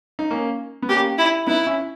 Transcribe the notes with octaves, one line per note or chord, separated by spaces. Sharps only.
D#4
A#3 C#4
B3
A#3 C#4 G4
E4
B3 D#4 E4
C#4 E4